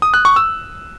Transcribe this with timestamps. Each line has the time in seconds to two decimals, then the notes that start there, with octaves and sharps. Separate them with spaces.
0.02 D#6
0.14 F#6
0.25 C#6
0.36 E6